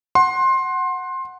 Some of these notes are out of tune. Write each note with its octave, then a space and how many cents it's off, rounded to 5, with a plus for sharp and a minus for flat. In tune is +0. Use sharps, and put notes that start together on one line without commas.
F#5 +0 C6 +20